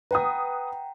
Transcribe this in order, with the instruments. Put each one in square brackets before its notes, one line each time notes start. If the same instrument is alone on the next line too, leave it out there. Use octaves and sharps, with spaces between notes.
[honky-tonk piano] B4 D#6 [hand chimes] F#5 G5 A#5